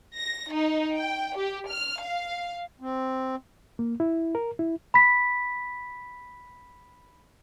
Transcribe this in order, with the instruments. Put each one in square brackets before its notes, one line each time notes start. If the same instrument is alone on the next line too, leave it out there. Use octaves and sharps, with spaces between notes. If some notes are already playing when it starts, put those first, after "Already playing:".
[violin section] A#6
D#4
G5
G4
F6
F5
[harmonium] C4
[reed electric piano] A#3
E4
A#4
E4
[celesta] B5 B6